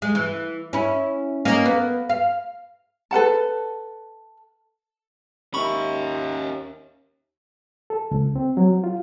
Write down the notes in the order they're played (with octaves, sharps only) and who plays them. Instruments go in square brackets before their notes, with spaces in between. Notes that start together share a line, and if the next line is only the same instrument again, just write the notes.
[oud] G#3
E3
C#4 E4
A#3 C#4 D#4
B3
F5
[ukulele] A4 B4 F#5 A5
[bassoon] D#2 [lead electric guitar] C#4 E5 [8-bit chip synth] B5 C#6
[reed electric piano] A4
C#2
C4
F#3
F4